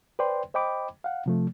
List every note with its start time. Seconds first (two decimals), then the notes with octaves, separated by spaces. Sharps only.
0.19 B4 C5 D5 G5 C6
0.54 C5 D#5 G5 B5 D6
1.04 F5 F#5
1.26 C3 F3 A3